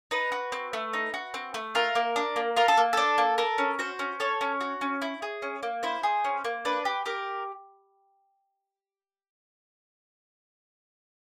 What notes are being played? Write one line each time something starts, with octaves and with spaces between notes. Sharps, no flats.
D#4 B4
F#4
C4
A3
D#4
F#4
C4
A3
F4 A#4
A#3
D4
A#3
F4 A#4
A4
A#3
D4 A4
A#3
A4 A#4
C#4
F#4 C5
C#4
A4 C#5
C#4
F#4
C#4
E4
G#4
C#4
A#3
E4 C5
G#4
C#4
A#3
D4 B4
G4
G4 A#4